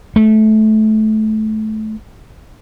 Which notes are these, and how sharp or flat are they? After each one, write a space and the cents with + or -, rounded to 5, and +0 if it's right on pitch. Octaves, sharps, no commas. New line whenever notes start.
A3 -20